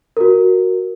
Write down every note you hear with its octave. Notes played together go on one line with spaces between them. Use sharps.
F#4 A#4